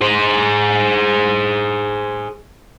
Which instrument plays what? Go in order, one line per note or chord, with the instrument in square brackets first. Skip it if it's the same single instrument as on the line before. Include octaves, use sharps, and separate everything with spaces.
[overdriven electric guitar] G#4 C5